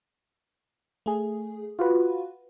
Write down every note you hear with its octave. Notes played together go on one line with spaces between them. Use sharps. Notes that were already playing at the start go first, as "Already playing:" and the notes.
A3 G#4
F4 F#4 B4